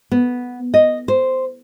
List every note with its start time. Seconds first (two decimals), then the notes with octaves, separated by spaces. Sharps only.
0.11 B3
0.74 D#5
1.08 C5